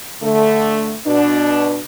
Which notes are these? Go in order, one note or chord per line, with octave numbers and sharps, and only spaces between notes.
D3 A3
B2 D4